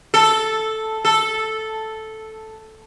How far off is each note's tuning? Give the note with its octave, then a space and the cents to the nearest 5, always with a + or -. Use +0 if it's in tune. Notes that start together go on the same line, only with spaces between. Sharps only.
A4 -5
A4 -5